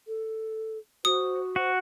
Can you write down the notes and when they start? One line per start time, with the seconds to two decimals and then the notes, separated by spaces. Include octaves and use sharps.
0.07 A4
1.05 F#4 C5 D#6
1.56 F#4 C5